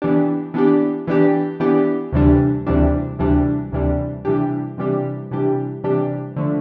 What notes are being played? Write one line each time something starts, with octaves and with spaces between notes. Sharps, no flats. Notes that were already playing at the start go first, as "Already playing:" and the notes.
E3 B3 D4 G4
E3 B3 D4 G4
E3 B3 D4 G4
E3 B3 D4 G4
D2 C3 E3 G3 D4
D2 C3 E3 G3 D4
D2 C3 E3 G3 D4
D2 C3 E3 G3 D4
C3 E3 G3 D4 G4
C3 E3 G3 D4 G4
C3 E3 G3 D4 G4
C3 E3 G3 D4 G4
D3 F3 A3